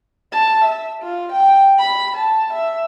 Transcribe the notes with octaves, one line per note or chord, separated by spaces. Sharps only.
A5
E5
F4
G5
B5
A5
E5